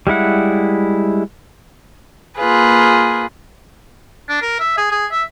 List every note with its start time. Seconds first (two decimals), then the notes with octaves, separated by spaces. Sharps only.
0.07 G3 G#3 E4 F#5
2.37 A#3 F4 G#4 B4
4.29 D4
4.42 A#4
4.59 E5
4.77 G#4
4.91 G#4
5.11 E5